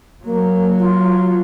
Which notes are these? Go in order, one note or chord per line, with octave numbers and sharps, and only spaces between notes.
F#3 A#3
F4